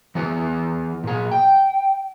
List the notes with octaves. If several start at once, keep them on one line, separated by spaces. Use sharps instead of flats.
E3 B3 G#4 B4
A#2 G#4
G5